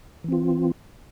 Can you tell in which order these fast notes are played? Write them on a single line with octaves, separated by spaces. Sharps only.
E3 C4 F4